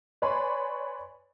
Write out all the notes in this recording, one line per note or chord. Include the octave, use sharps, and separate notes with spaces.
B4 C#5 D5 G#5 B5 C6